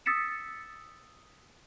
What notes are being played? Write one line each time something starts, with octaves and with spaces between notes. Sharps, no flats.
D#6 E6 A6 B6 C#7 E7